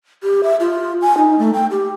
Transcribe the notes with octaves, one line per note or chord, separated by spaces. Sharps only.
G4
E5
F4
G#5
D#4
A3
G5
G4